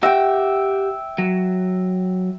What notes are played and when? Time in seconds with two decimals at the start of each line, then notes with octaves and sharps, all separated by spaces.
0.03 G4 E5 F#5 G5
1.18 F#3